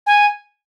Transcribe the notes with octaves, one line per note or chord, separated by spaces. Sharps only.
G#5